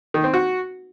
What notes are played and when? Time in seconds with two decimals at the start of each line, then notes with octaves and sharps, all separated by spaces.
0.14 D#3
0.24 C4
0.34 F#4